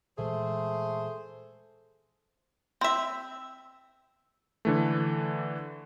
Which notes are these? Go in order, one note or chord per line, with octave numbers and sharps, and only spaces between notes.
A#2 E3 G#3 A3 G#4 C5
C4 E5
D3 E3 A3